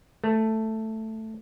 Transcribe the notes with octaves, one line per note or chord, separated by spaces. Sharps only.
A3